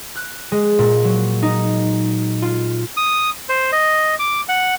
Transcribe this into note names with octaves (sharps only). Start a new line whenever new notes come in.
F#6
G#3
A#2
F#3
D#4
F4
D#6
C5
D#5
D6
F#5